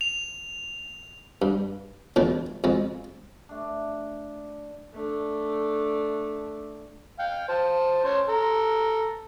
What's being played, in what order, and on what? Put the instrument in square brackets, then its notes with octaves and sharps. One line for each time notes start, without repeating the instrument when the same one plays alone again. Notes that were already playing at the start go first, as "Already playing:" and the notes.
[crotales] F7
[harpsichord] G2
A#1 E2 A2
F2 G#3
[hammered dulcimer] A3 D4
[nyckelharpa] A3 D4
[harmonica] F5 G5
C5 A5
C#4 C6
A4 A#5